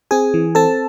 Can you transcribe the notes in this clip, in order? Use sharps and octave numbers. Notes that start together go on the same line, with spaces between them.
C4 G#4 G#5
E3
C4 A4 A5